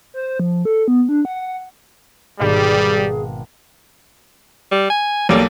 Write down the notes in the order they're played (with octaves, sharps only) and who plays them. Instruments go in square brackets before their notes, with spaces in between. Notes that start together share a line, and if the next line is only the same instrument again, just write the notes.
[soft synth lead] C5
F3
A4
B3
D4
F#5
[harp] G#1 B2 F5 [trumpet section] G3 [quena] G#4
[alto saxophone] G3
G#5
[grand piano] B1 A#3 A4 [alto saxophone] G3